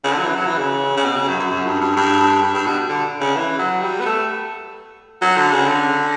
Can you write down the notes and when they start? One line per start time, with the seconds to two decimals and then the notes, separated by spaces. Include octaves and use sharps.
0.04 C#3
0.12 D3
0.18 F#3
0.23 E3
0.35 F#3
0.47 E3
0.58 C#3
0.97 C#3
1.05 B2
1.16 C#3
1.28 F#2
1.39 F#2
1.51 F#2
1.67 G2
1.81 G2
1.96 G2
2.43 G2
2.54 G2
2.67 B2
2.89 D3
3.20 C#3
3.36 E3
3.59 F#3
3.82 G3
4.00 B3
4.06 A3
5.22 F#3
5.37 D3
5.52 C#3
5.68 D3